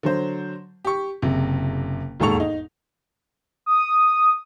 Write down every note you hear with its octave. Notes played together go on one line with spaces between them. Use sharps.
D3 F#3 C5
G4 C#6
F#1 C3
E1 D#2 G#2 A4 C#6 F7
D#4
D#6